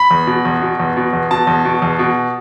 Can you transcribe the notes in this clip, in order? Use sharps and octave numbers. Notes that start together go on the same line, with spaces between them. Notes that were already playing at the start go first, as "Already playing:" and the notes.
Already playing: B5
E2
B2
E2
B2
E2
B2
E2
B2 A5
E2
B2
E2
B2